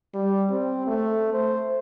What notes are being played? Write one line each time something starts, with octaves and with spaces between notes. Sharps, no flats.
G3
C4
A3
C5